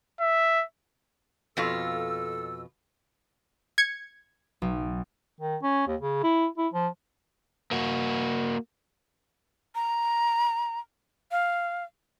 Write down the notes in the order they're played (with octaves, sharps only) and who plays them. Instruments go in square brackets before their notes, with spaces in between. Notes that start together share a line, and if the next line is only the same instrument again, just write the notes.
[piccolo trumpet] E5
[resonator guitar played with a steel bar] F2 B2 F4 [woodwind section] A4 E6
[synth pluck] G#6 C#7
[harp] B1
[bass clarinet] D#3
C#4
D#2
C#3
E4
E4
F3
[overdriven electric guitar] A#3 F#4
[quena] A#5
F5